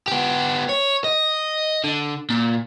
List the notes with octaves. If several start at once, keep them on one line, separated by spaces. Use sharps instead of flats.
B3 G4
C#5
D#5
D3
A#2